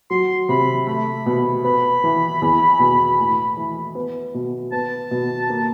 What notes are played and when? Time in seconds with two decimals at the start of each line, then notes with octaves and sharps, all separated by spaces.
0.10 F#3 C6
0.49 C3 B5
0.87 A3 B5
1.26 B2
1.64 B3 B5
2.04 E3
2.42 E2
2.79 B2
3.19 A2
3.57 E3
3.95 B3
4.34 B2
4.72 B3 A5
5.11 B2
5.50 A#3